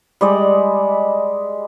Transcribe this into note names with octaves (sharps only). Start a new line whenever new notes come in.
G3 G#3 D5 D#5